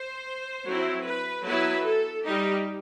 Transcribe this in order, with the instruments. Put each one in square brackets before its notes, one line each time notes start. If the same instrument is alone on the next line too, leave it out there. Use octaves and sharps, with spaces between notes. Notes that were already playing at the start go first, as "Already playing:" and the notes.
Already playing: [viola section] C5
F#3 C4 E4
B4
F#3 B3 E4 B4
A4
G3 D#4 G4